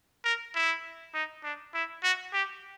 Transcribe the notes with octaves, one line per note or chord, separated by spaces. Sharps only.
A#4
E4
D#4
D4
E4
F#4
G4